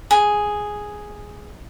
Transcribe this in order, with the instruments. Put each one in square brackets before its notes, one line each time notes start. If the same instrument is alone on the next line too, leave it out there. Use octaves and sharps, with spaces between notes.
[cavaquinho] G#4